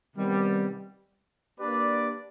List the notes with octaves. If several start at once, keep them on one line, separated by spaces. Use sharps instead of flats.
C3 D#3 G3 B3
A#3 D4 G4 B4 D5